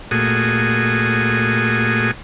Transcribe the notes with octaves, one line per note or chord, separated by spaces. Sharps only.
A#2 A3 F#4 G#4 D#6